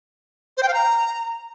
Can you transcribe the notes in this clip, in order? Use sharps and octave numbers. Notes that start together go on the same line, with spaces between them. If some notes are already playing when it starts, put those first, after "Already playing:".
C5
G5
F5
A#5